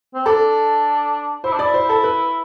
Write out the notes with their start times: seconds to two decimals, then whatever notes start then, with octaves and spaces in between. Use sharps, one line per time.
0.14 C4
0.26 D4 A4
1.44 E4 C5
1.53 D4
1.59 E4 D5
1.74 C5
1.89 A4
2.04 B4